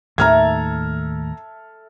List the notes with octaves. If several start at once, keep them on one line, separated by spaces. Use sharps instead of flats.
D#2 A2 D#3 A4 E5 A#5 F6 G#6